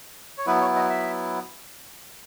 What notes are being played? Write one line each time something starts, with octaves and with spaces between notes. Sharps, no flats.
C#5
F#3 B3 E4 B4
C#5
D#5
E5